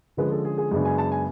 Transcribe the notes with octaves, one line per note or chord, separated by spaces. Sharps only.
D3 F3 G#3 C#4 B4
A4
G#4
G#4
F#2 C#3 G#3 B3 D4
G#5
A5
G#5